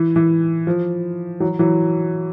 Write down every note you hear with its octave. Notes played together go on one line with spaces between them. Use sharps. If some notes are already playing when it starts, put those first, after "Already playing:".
Already playing: E3
E3
F3
E3 F#3
E3 F#3